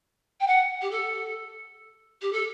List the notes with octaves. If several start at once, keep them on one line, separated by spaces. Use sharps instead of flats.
G5
F#5
G4
A4
G4
A4